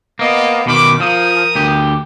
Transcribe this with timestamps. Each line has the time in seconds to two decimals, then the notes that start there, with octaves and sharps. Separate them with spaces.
0.19 A#3 B3 D#5
0.67 B2 D#3 B5 D6
1.00 F3 A#4 D#6
1.55 D2 G4